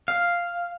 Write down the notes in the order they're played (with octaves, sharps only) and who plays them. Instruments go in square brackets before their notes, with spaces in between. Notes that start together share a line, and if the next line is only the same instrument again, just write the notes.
[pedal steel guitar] F5